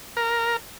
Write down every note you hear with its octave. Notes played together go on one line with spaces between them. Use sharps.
A#4